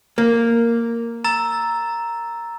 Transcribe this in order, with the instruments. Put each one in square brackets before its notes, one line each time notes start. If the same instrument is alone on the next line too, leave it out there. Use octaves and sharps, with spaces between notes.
[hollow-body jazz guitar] A#3
[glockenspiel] A#5 E6 A6